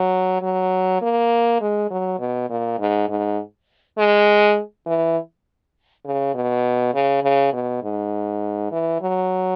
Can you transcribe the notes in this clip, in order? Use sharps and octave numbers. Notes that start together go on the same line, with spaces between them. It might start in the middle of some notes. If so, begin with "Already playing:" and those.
Already playing: F#3
F#3
A#3
G#3
F#3
B2
A#2
G#2
G#2
G#3
E3
C#3
B2
C#3
C#3
B2
G#2
E3
F#3